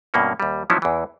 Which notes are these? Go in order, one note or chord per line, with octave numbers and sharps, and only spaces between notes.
G2 B2 A#3 C#4
D#2 G3
F3 F#3 B3 C#4 D#4 E4
E2 E3